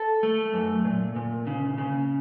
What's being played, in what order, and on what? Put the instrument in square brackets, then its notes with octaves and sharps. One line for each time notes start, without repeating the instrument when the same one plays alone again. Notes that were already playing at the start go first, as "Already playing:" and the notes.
Already playing: [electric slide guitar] A4
A3
F#2
A#2
A#2
C#3
C#3